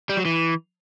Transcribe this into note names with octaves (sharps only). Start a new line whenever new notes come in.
G3
F#3
E3